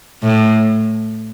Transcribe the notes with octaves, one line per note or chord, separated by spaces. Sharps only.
A2